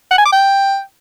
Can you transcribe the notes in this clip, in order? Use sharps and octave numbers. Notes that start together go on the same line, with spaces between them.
F#5
G#5
D6
G5